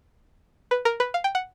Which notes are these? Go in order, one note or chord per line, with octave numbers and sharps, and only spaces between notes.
B4
A#4
B4
F5
G5
F#5